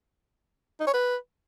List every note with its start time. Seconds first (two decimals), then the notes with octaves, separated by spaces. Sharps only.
0.80 D#4
0.87 C#5
0.94 B4